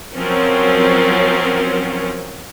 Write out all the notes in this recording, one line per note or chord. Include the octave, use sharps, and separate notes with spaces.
F3 F#3 C4 C#4 A#4